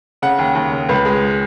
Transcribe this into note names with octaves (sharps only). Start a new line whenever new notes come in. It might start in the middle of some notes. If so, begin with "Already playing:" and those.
C#3 F#5
D#2
D#2
C#3
C#2 B4
G#3